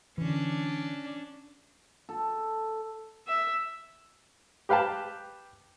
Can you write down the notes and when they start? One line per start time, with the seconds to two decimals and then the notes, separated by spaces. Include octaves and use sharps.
0.18 D3 E3 C#4 D4
2.09 A4
3.27 E5
4.69 G4 B4 F5 G5 A5